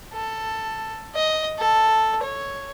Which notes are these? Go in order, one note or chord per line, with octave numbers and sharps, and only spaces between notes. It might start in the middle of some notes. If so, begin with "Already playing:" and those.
A4
D#5
A4
C#5